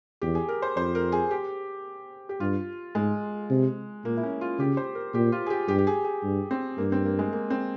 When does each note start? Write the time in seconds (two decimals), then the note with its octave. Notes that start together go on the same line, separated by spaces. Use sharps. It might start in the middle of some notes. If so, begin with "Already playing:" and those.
0.22 E2 G4
0.35 G#4
0.48 A#4
0.62 C5
0.76 F2 C5
0.95 A#4
1.12 G#4
1.31 G4
2.29 G4
2.40 G2 F4
2.95 G#2 G#3
3.50 C3
4.05 A#2 A#3
4.17 E4
4.23 C#4
4.41 F4
4.59 C#3 G4
4.77 C5
4.95 A#4
5.14 A#2 G4
5.32 F4
5.46 G#4
5.50 G4
5.68 G2 G4
5.78 G4
5.87 G#4
6.04 G#4
6.23 G2
6.51 C4
6.78 G2 A#3
6.92 C4
7.06 A#3
7.19 G#3
7.33 A#3
7.50 C4